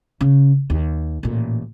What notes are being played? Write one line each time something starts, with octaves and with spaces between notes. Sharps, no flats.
C#3
D#2
A1 A#2